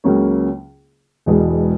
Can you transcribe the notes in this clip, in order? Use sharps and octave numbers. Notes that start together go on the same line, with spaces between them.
C#2 C#3 F#3 A#3 C#4
E1 E2 B2 G#3